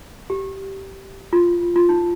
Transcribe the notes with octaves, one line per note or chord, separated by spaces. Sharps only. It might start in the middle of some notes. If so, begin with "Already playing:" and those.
G4
F4
F4
D#4